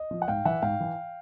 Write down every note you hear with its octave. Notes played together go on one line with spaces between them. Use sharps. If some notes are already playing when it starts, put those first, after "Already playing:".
Already playing: D#5
F3
F#5
G#2 F5 G5
E3 E5 F#5
G#2 F5 G5
E3